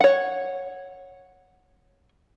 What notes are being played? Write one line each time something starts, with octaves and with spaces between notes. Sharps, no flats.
C#5 F#5